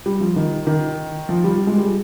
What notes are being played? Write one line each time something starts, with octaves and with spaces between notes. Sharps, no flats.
G3
F3
D#3
D#3
F3
G3
G#3
G3